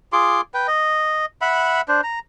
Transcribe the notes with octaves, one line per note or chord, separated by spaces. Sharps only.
F4 G#4 C6 D6
B4 G5
D#5
E5 F#5 B5
D4 C5
A#5